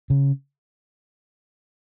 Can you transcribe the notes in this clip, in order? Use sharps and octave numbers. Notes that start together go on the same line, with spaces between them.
C#3